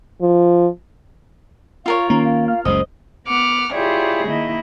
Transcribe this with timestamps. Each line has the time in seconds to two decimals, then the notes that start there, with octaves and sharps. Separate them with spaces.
0.21 F3
1.86 F4 A#4 C#5 F5
2.10 D#3 A#3 C#4 A#5
2.24 F5
2.48 F5 F6
2.65 F#1 C#2 C#3 C5 D#5
3.27 B3 F#5 D6 F6
3.73 E4 F4 G4 G#4 C#5 D5
4.26 D#3 A#3 E4 D#5